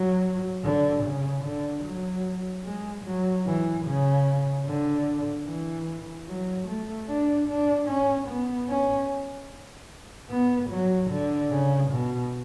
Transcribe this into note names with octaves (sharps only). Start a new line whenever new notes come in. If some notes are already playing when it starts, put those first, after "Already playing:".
Already playing: F#3
D3
C#3
D3
F#3
G#3
F#3
E3
C#3
D3
E3
F#3
A3
D4
D4
C#4
B3
C#4
B3
F#3
D3
C#3
B2